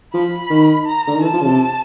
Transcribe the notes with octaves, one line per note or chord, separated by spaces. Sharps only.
F3 B5
D#3
A#5
D3
D#3
E3 A5
F3
C#3
C3